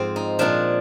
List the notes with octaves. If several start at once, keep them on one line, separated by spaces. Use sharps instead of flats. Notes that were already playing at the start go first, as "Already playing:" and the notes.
Already playing: G#2 F3 C4
D#4
A#2 F3 D4